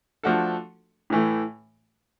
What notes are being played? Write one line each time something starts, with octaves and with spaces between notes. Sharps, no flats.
F3 A3 D4 F#4 A4
A2 E3 A3